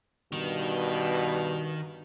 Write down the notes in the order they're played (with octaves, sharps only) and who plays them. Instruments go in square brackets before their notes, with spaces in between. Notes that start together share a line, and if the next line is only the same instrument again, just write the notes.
[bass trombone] G2 [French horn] B2 [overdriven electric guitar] D#3